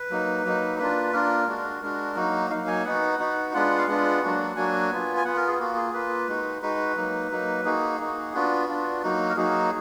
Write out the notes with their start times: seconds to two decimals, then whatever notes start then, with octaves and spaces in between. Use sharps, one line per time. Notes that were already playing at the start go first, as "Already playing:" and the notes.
Already playing: B4
0.10 F#3 A#3 D#4
0.45 F#3 A#3 D#4
0.79 A#3 D4 F4 B4
1.13 A#3 D4 F4 A#4
1.48 G#3 D4 F#4
1.82 G#3 D4 F#4 A#4
2.16 F#3 A#3 D#4 F#4
2.50 F#3 A#3 D#4 F5
2.67 G#5
2.85 B3 D#4 F#4 F#5
3.19 B3 D#4 F#4
3.54 G#3 B3 D4 F4 F#5
3.78 F5
3.88 G#3 B3 D4 F4 F#5
4.22 F#3 A#3 D4 F#4
4.56 F#3 A#3 D4 F#4 G#5
4.90 B3 F4
5.17 G#5
5.25 B3 F4 F#5
5.36 A#4
5.48 G#4
5.59 A#3 F4 F#4
5.76 G#4
5.93 A#3 F4 B4
6.28 G#3 D#4 F#4
6.62 G#3 D#4 F#4 B4
6.96 F#3 A#3 D#4
7.31 F#3 A#3 D#4
7.65 A#3 D#4 F#4 G#4
7.99 A#3 D#4 F#4
8.34 B3 D4 F4 F#4
8.68 B3 D4 F4
9.02 F#3 A#3 D#4 F#4
9.29 A#4
9.37 F#3 A#3 D#4 F#4 G#4